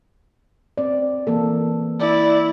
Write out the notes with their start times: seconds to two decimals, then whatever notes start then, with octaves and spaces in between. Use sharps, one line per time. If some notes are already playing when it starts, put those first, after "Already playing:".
0.78 C4 D5
1.27 E3 A#3 A4
1.99 E4 D5